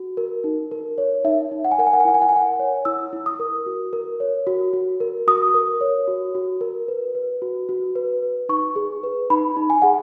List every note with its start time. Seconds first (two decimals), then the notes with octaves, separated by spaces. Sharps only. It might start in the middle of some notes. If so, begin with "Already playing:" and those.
Already playing: F#4
0.17 A#4
0.44 D#4
0.71 A#4
0.98 C#5
1.24 D#4 E5
1.51 D#4
1.64 F#5
1.72 G#5
1.79 A#4 F#5
1.87 G#5
1.93 F#5
2.00 G#5
2.05 E4 F#5
2.14 G#5
2.22 F#5
2.29 G#5
2.32 A#4 F#5
2.59 C#5
2.85 E4 E6
3.13 E4
3.26 D#6
3.39 A#4
3.66 F#4
3.93 A#4
4.20 C#5
4.47 F#4
4.73 F#4
5.00 A#4
5.27 F#4 D#6
5.54 A#4
5.81 C#5
6.08 F#4
6.35 F#4
6.61 A#4
6.88 B4
7.15 B4
7.42 F#4
7.69 F#4
7.96 B4
8.22 B4
8.49 D#4 C#6
8.76 G#4
9.04 B4
9.30 D#4 B5
9.57 D#4
9.70 G#5
9.82 G#4 F#5